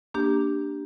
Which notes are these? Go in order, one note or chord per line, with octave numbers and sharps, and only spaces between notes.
A#3 D4 G4